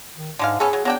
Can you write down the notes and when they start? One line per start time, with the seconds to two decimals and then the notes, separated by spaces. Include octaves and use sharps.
0.18 D#3
0.39 G#2 D3 G#3 F5
0.60 B3 C#4 G#4 A4
0.73 F#3
0.85 F#3 B3 D4 G5